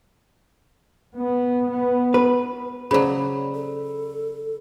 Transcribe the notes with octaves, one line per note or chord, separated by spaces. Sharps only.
B3
B3
B4
C#3 F#3 G#4 C5 D5 B5
A4